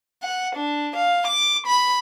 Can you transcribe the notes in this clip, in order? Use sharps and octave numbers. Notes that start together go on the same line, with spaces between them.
F#5
D4
F5
D6
B5